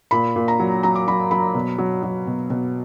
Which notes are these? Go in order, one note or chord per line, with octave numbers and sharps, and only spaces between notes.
A#2 B5
A#2
A#5
F#3
F#3 A#5
D6
F#3 B5
F#3 B5
B2
F#3
F#3
B2
B2